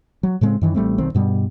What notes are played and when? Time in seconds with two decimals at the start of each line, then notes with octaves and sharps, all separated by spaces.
0.23 F#3
0.41 A2 C#3 G#3 C4
0.61 F#2 D#3 E3
0.74 A1 G3 A3 C4
0.98 B1 D#3 C4
1.14 G2 B2 G3